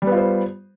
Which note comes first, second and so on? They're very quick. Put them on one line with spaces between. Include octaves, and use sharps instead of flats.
G3 B3 F4 C5